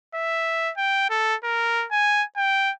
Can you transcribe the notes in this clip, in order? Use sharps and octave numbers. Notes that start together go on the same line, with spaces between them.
E5
G5
A4
A#4
G#5
G5